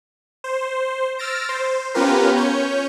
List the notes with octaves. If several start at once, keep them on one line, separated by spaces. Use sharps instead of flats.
C5
E6 F6 A6 A#6 D7
C5
B3 C#4 F4 G4 A#4 B4
C#4 C#5 G6